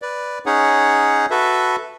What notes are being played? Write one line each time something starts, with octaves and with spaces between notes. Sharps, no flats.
B4 D5
C#4 D#4 G#4 C#5 F#5
F#4 A4 B4 E5